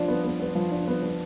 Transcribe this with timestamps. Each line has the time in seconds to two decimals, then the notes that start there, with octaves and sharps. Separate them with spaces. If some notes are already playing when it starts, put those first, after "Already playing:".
Already playing: F3 D4
0.08 B3
0.25 B3
0.40 B3
0.55 F3
0.72 D4
0.88 B3
1.03 B3